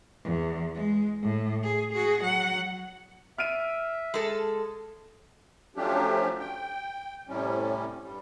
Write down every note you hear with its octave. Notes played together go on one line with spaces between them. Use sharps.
E2
G#3
A2
G#4
F#4 G#4
F#3 F#5
E5 F6 D7 D#7
G#3 A4
F3 F#3 A3 C#4 D4 G4
G5
A2 C3 G3 C#4
G2 G3